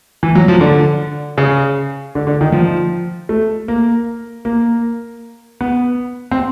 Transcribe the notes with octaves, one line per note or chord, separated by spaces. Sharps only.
E3
F#3
F3
D3
C#3
D3
D3
D#3
F3
A3
A#3
A#3
B3
C4